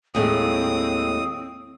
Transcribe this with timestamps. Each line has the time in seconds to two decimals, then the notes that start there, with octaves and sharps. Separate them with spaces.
0.15 D#2 A2 G#3 C4 D#6